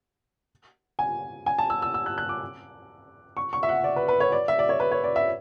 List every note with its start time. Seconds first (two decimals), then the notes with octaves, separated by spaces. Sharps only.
0.99 G#5
1.46 G#5
1.58 A5
1.70 E6
1.82 E6
1.94 E6
2.06 F#6
2.18 F#6
2.29 D6
3.37 C#6
3.53 C#6
3.63 E5
3.69 F#5
3.84 D5
3.96 B4
4.08 B4
4.20 C#5
4.32 D5
4.48 E5
4.59 D5
4.69 C#5
4.80 B4
4.91 C#5
5.04 D5
5.16 E5